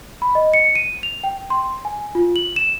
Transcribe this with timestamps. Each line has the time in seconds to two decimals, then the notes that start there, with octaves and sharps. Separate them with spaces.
0.22 B5
0.35 D#5
0.54 C#7
0.75 D#7
1.03 F7
1.24 G5
1.50 C6
1.85 G#5
2.15 F4
2.36 F#7
2.56 E7